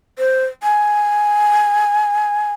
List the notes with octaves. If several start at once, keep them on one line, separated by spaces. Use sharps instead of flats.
C5
G#5